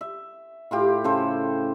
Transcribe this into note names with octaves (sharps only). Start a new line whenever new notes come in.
E5
A2 F4 G4
C#3 A4 C5